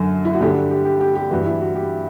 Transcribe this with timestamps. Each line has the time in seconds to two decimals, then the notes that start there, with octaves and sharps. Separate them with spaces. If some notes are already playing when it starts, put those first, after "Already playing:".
Already playing: F#2 D3
0.25 E4
0.34 F#4
0.41 G2 D3 G4
0.71 G4
0.85 G4
1.00 G4
1.15 G4
1.31 E3 F#4
1.34 G2
1.46 E4
1.61 F#4
1.75 G4